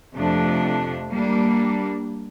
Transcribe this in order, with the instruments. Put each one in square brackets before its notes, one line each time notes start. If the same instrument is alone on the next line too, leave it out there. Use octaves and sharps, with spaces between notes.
[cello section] F2 C3 F3 A3 D4
G3 A#3 D4